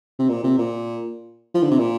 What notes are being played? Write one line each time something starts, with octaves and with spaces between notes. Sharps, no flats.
C3
A#2
C3
A#2
F3
D3
C3
A#2